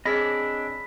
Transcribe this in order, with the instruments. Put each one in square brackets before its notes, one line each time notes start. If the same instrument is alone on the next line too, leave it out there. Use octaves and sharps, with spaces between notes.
[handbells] C4 G#4 E6 [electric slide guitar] D4 C#5 D#5 [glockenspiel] B5 B6